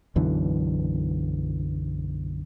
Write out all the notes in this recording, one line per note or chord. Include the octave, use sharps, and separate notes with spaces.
B1 F#2 D3 E3